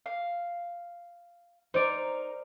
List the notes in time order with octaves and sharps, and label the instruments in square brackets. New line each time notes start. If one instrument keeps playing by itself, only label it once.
[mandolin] F5
[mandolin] D#4 A#4 [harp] C5 D5